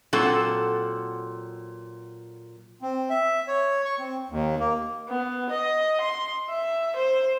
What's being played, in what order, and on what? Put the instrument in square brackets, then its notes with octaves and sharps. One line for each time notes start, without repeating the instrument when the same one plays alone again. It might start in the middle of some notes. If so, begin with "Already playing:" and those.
[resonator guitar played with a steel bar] A#2 F#3 C4 A4 F#5
[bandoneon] C4
E5
C#5
C#6
C4
D#2
A#3
[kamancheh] B3
D#5
C6
E5
C5